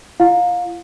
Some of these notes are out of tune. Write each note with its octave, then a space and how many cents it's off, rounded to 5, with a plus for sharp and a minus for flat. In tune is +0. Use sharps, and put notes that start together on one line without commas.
F4 -45 F5 +30